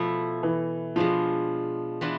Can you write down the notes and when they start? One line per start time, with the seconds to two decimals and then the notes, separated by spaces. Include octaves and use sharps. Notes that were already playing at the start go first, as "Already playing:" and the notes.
Already playing: B2 F3 A3 E4
0.43 E3
0.96 B2 F3 G#3 D4 F4
2.01 E3 B3 D4 F4